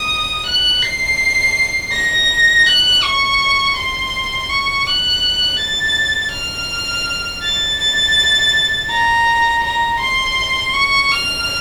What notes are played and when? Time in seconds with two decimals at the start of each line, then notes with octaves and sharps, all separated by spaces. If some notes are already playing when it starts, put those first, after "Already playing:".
Already playing: D#6
0.46 F#6
0.82 C7
1.93 A#6
2.66 F#6
3.03 C#6
3.76 C6
4.49 C#6
4.87 F#6
5.60 A6
6.33 F6
7.43 A6
7.80 A6
8.90 A#5
9.64 A#5
10.00 C6
10.74 C#6
11.11 F6